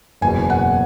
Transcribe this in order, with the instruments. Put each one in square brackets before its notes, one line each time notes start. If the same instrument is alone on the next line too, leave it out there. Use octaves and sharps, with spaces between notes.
[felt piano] F#1 E2 B2 G#5
F#5